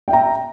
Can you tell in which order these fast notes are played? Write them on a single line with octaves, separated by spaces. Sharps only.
G5 E5 A#5